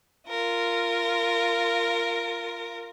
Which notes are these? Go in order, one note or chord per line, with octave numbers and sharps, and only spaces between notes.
F4 A#4